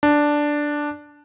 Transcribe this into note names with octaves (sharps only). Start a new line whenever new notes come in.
D4